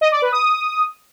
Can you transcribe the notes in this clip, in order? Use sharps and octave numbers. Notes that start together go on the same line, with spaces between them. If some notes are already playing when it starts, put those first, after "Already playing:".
D#5
D5
B4
D#6